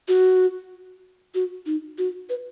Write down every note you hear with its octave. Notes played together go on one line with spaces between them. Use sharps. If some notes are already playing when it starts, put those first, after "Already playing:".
F#4
F#4
D#4
F#4
B4